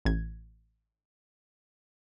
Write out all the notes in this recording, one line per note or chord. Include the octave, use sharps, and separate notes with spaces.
A1 G#6